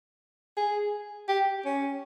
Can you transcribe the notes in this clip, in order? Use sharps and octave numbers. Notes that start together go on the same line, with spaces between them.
G#4
G4
C#4